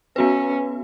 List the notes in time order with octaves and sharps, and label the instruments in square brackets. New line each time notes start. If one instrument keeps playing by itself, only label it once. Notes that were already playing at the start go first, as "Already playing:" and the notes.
[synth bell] B3 F#4 B4 [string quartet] C#4